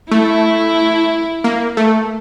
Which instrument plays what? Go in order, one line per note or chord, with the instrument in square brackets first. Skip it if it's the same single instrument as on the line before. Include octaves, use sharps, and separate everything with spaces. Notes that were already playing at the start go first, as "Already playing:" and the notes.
[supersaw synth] A3 [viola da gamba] E4
[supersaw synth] A#3
A3